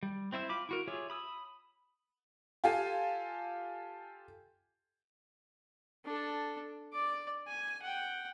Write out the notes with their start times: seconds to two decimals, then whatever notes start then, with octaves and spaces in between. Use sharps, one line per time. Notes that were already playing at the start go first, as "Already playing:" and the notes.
0.03 G3
0.32 C4 E4 C5 E5
0.49 F4 B5 D6
0.69 E4 F#4 A#4
0.87 F4 G4 G#4 C#5 E5
1.10 B5 D#6 E6
2.64 F4 G4 A4 F5 G#5
6.05 D4 A4
6.93 D5 D6
7.47 G#5
7.82 F#5 G5